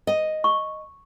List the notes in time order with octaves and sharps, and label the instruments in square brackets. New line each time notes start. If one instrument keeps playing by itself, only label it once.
[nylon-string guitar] D#5
[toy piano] C#6